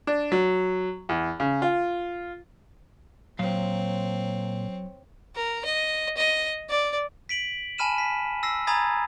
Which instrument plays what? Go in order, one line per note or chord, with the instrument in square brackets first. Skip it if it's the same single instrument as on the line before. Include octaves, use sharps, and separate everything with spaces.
[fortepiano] D4
F#3
E2
C#3
F4
[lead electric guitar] A#2 F5 [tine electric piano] F#3 [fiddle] C4 C#5
[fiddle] A#4
D#5
D#5
D5
[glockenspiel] B6 D7 F#7
G#5 A5 B5 F6 D#7 E7
B6
E6 A#6 C7
G#5 A#5 B5 D#6 G#6 A6